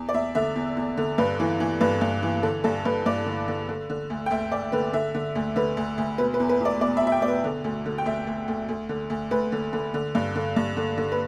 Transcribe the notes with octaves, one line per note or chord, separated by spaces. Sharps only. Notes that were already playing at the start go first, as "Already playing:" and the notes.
Already playing: E2
D5
E2 E5
D3 E5
E2
E2
D3
G2 B4
E3
E3
G2 B4
G2
E3
D3 A4
G2 A4
G2 B4
G2 D5
D3
D3
D3
D3
D2
G5
D2 E5
D2 D5
D3 B4
D3 E5
D3
D2
D3 B4
D2
D2
B2 B4
B4
E2
B4
E2 D5
B2 D5
E5
B2
E5
G5
B2 D5
B4
D3
D2
D3
G5
D2 E5
D2
D2
D2
D3
D2
D2 B4
D3
D3
D3
G2
D3
G2
D3
D3
B4